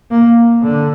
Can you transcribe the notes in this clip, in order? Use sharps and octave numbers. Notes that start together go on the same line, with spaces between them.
A#3
D3